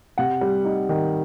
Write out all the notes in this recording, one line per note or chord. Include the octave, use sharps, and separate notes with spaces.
C3 F#5
G3
D#4
D#3